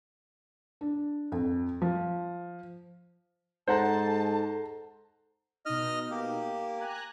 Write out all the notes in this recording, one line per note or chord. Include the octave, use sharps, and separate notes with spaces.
D4
F2
F3
G#2 A4 C5 F#5 A5 A#5
B2 D#4 D#5 F6
A#3 G4
G#5 A#5 F#6